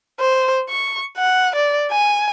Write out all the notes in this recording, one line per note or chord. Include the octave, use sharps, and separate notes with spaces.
C5
C#6
F#5
D5
G#5